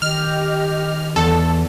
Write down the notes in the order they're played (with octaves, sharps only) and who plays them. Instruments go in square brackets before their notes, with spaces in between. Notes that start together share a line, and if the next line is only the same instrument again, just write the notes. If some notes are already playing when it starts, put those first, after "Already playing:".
[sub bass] D#3 [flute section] G4 D#5 [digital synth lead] F6
[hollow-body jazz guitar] E2 [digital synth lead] A4